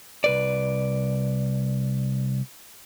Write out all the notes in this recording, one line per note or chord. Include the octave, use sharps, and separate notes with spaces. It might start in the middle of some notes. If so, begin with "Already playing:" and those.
C2 B4 D5